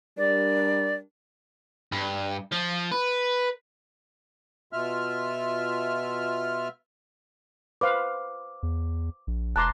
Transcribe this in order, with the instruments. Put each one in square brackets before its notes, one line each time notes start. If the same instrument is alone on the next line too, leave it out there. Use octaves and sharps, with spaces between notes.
[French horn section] G3 D4 A#4 [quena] D5
[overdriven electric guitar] G2
F3
B4
[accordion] B2 F4 E5 F6
[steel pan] B4 C5 F5 [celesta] D6
[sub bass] E2
A#1
[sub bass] E1 [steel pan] A5 A#5 C6 [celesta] D6 F#6